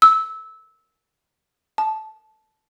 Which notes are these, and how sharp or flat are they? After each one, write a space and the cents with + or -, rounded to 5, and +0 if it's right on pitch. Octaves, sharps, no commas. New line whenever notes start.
E6 -20
A5 -15